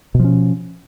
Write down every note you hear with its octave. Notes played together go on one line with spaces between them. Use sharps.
B2 F3 C#4